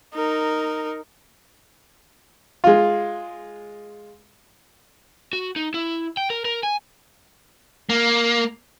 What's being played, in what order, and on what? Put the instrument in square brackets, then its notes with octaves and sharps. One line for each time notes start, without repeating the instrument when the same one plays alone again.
[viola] D#4 A#4
[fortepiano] G#3 F4
[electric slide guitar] F#4
D#4
E4
G5
A#4
A#4
G#5
[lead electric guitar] A#3